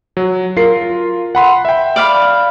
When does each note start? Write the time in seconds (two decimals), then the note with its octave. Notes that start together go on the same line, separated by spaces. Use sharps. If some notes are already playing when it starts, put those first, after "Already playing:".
0.17 F#3
0.56 F4 A#4 C7
1.35 F#5 B5 C6
1.65 E5 G5
1.96 D5 F5 B5